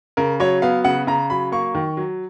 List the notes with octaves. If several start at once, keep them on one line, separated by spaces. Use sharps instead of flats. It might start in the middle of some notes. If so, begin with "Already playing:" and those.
C#3 A#4
F#3 C#5
B3 F5
C#3 F#5
C#3 A#5
F#3 B5
A#3 C#6
D#3
F#3